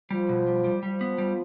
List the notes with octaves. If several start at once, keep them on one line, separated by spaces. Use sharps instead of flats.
F3 G3
B2
G3
G3
F3 G3
B3
G3